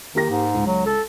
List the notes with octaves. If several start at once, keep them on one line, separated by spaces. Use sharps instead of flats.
D#3 A#3 G4 A#6
G#2
C#2
F#3
A4